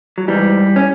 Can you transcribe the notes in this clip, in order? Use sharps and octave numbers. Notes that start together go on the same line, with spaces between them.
F#3
G#2 E3 G3
C#4